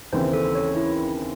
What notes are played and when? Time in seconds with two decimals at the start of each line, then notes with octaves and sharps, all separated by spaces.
0.12 D#2 C#3 E3 C4 C5
0.33 A4
0.55 C#5
0.76 E4